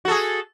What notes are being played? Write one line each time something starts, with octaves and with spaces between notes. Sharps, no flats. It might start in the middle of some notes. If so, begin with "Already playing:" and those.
F#4 G#4 A4